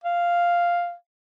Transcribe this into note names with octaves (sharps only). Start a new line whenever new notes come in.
F5